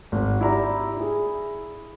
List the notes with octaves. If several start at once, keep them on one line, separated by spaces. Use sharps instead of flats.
G#1
E4 G4 D5 A#5
E4 G#4